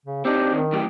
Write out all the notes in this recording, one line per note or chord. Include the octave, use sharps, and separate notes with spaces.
C#3
C4 D4 D#4 G4
D#3
F#2 A2 G4